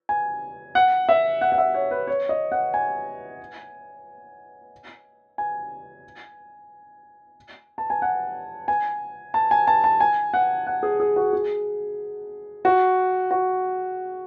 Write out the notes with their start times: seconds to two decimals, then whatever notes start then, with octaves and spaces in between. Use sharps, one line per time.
0.09 G#5
0.75 F#5
1.09 E5
1.41 F#5
1.52 F#5
1.58 E5
1.74 C#5
1.91 B4
2.07 C#5
2.29 D#5
2.52 F#5
2.74 G#5
5.38 G#5
7.78 A5
7.90 G#5
8.02 F#5
8.68 G#5
9.34 A5
9.51 G#5
9.67 A5
9.84 A5
10.00 G#5
10.34 F#5
10.67 F#5
10.83 G#4
11.00 G#4
11.16 F#4
11.33 G#4
12.65 F#4
13.31 F#4